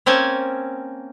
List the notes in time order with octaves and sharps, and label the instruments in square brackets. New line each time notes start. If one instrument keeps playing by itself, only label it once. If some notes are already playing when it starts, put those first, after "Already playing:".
[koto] A#3 C4 C#4 G#5 A5